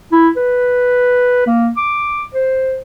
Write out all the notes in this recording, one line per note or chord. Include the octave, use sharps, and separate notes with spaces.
E4
B4
A#3
D6
C5